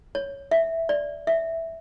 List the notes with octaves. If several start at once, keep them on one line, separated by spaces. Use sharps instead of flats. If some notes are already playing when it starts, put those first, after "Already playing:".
C#5
E5
D5
E5